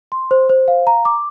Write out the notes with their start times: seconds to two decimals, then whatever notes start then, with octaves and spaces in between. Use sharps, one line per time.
0.12 C6
0.31 C5
0.49 C5
0.68 F5
0.87 A#5
1.05 D6